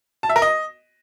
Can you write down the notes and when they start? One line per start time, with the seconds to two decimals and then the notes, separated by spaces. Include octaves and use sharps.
0.23 A5
0.29 E5
0.36 A#4
0.42 D#5